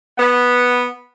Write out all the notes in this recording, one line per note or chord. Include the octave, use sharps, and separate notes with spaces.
B3